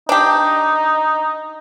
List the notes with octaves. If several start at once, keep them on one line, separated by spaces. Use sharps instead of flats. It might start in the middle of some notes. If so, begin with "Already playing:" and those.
D4 D#4 G4